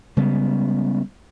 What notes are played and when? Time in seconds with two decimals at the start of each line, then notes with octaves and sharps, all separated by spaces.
0.17 C#3 G3 G#3 B3